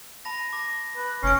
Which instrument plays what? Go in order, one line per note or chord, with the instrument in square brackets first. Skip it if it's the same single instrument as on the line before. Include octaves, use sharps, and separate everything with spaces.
[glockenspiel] A5 B5 A#6
D6 A#6
[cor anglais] B4
[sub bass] F1 [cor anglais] C#4 [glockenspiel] C7 D7